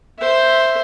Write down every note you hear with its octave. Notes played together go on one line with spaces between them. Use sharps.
C5 E5